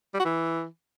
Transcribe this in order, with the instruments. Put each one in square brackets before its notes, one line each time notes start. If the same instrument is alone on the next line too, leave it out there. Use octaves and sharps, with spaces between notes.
[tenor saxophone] G3
F#4
E3